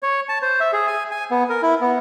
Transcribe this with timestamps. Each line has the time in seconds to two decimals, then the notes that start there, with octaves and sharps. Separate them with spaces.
0.03 C#5
0.29 A5
0.42 C5
0.60 E5
0.73 G#4
0.87 G#5
1.11 G#5
1.31 B3
1.49 A#4
1.63 E4
1.81 B3